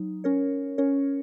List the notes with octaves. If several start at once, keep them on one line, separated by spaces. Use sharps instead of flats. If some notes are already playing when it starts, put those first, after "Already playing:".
Already playing: F#3 D#4
C#4 A#4 C#5
C#4 A#4 C#5